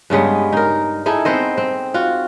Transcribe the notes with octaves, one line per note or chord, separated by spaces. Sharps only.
G2 C#3 G#3 B3
D#4 A#4
D#4 E4 G#4 A4
B3 C4 C5 D#5
C4
F4 F#4